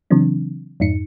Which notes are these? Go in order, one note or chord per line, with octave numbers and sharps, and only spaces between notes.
C#3 E3 F#3 C4 D4
F2 G#2 D#4 C#7